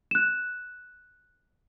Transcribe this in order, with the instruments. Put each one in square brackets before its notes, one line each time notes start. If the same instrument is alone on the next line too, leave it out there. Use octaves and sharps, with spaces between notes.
[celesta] F#6 E7